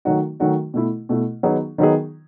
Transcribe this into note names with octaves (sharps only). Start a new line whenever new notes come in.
D#3 F#3 A3 D#4 F#4
D#3 F#3 A3 D#4 F#4
B2 A3 E4
B2 A3 E4
D#3 F#3 B3 D#4 G#4
D#3 F#3 B3 D#4 G#4